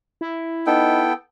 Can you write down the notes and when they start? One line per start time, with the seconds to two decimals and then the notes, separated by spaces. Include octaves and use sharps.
0.21 E4
0.67 B3 D#4 A4 G5